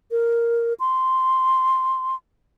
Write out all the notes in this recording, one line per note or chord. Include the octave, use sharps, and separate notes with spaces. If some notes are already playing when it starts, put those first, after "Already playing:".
A#4
C6